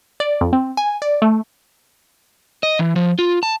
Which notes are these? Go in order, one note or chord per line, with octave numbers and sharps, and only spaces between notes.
D5
F2
C4
G#5
D5
A3
D#5
E3
F3
F4
A5